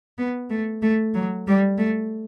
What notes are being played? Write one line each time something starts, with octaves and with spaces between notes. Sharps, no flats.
B3
A3
A3
F#3
G3
A3